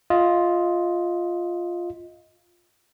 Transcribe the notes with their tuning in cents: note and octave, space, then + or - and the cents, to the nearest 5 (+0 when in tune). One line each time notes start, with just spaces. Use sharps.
F4 +0 D#5 +20